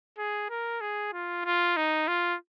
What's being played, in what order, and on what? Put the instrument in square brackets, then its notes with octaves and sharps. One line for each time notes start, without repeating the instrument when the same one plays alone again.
[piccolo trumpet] G#4
A#4
G#4
F4
F4
D#4
F4